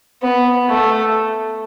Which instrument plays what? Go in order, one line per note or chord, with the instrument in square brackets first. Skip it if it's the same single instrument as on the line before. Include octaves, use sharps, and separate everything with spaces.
[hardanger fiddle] B3
A3